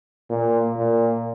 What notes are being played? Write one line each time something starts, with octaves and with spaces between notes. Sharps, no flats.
A#2
A#2